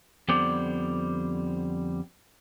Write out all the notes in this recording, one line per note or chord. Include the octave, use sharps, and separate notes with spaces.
F2 D3 G3 B3 C5 D5